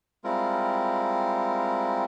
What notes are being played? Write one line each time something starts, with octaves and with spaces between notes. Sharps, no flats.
G3 G#3 C4 E4 F4 A#4